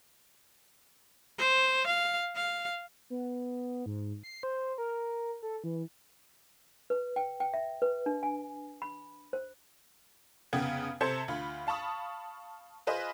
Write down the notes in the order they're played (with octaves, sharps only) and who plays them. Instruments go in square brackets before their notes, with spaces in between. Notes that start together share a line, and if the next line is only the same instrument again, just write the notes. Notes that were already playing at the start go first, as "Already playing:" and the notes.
[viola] C5
F5
F5
[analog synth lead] B3
G#2
C7
C5
A#4
A4
E3
[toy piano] B4
G5
G5
E5
B4
D4
G#5
B5
C5
[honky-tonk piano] F1 C#3 B3 G5 G#6
C3 A4 C5 A5 G#6 C#7
D2 F4 B5
F5 A5 B5 C#6 D#6
F4 G#4 B4 C5 D#5